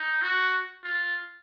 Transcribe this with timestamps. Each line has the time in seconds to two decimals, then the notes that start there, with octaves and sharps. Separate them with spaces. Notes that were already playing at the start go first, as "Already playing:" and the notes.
Already playing: D#4
0.22 F#4
0.84 F4